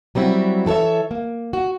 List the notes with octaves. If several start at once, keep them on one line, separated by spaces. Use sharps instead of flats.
F#3 G3 C4 E4 F#4
E3 A4 A#4 C#5 E5
A#3
F#4